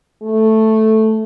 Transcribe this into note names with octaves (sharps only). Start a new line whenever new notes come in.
A3